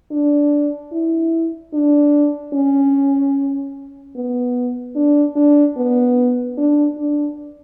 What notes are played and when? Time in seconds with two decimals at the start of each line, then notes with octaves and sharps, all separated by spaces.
0.12 D4
0.92 E4
1.74 D4
2.54 C#4
4.16 B3
4.96 D4
5.36 D4
5.77 B3
6.58 D4
6.98 D4